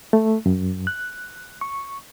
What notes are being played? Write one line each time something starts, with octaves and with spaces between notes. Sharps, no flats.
A3
F#2
F#6
C#6